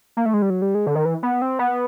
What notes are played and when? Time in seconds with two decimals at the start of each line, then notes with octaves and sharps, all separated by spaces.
0.17 A#3
0.26 A3
0.34 G#3
0.42 G3
0.50 F#3
0.62 G3
0.75 G#3
0.86 D3
0.95 D#3
1.05 E3
1.23 B3
1.42 C4
1.59 B3